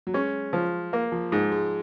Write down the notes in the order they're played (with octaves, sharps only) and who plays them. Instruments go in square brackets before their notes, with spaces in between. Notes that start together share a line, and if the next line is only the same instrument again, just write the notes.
[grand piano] F#3
[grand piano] G#3 [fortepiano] C#4
[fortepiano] F3
A#3
[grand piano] F3
[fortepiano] G#2 [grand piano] G#3
[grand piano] G#3